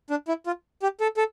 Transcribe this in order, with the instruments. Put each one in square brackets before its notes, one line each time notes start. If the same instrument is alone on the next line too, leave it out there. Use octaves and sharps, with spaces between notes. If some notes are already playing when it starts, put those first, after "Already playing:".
[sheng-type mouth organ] D4
E4
F4
G4
A4
A4